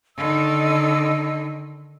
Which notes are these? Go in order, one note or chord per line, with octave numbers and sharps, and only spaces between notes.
D3 D#3 D#5 E6